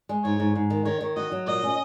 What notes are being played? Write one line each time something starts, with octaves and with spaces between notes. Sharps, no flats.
G#3
G#2 C#5
G#2
G#2
D#3
D#3 C#5
D#3
F#4 D#5
F#3
A#2 D#5
C#4